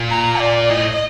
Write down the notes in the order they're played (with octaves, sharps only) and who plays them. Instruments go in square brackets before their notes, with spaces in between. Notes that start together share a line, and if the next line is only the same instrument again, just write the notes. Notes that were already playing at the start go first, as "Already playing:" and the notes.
Already playing: [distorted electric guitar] A#2
[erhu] A#5
D5
[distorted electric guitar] A2 [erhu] D#5